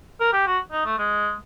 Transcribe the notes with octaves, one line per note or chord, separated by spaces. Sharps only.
A#4
G4
F#4
D#4
A3
G#3